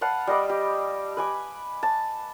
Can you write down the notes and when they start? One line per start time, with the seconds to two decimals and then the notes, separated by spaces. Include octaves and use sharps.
0.01 B4 F5 F#5 A5
0.27 G3 D#5 D6
0.49 G4
1.17 B4 G#5 D6
1.83 A5